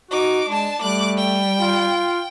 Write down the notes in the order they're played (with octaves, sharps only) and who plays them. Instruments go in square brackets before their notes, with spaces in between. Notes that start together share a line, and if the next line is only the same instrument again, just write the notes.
[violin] D#4 D6 [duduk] F#4
[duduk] G#3 [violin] D4 A5
[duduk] G3 [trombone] A3 [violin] D6 F#6
[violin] G5
[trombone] F4